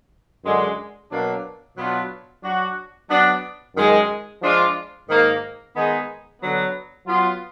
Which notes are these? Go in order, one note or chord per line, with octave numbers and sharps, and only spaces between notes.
F#2 D3 G#3
B2 F#3 A#3 D4
B2 F#3 B3 D4 F4
F#3 D4 F#4
F#3 B3 D4
F#2 D#3 G#3
F3 G#3 D4 F4
G#2 D#3 A#3
D#3 G#3 B3 D#4 G#4
D3 F#3 B3
F#3 B3 F4